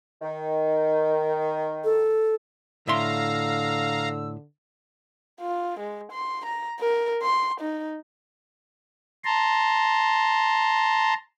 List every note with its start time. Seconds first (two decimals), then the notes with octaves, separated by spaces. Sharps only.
0.22 D#3
1.84 A4
2.87 A2 D3 E5 F5 A#5 C6 E6
5.41 F4
5.79 G#3
6.12 C6
6.45 A#5
6.80 A#4
7.23 C6
7.61 D#4
9.25 A5 A#5 C6